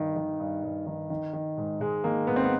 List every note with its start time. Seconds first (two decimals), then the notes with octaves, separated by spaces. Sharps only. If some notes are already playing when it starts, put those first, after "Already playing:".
Already playing: G2 D#3
0.16 D#3
0.40 G2
0.63 G2
0.86 D#3
1.10 D#3
1.33 D#3
1.58 G#2
1.80 G#2 G#3
2.04 D#3 A#3
2.27 G#2 B3
2.36 C4
2.44 B3